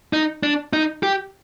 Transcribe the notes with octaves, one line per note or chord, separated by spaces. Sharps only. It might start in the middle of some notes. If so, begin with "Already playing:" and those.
D#4
D4
D#4
G4